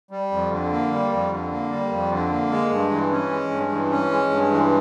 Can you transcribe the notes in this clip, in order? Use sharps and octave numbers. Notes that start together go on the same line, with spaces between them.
G3
F2
D3
A#3
G3
F2
D3
A#3
G3
F2
D3
A#3
G#3
G2
E3
C#4
G#3
G2
E3
C#4
G#3
G2
E3